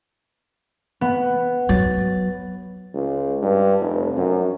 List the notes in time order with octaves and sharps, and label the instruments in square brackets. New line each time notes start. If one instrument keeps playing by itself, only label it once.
[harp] B3
[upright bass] F#3 [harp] A6
[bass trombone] C#2
G2
F1
F#2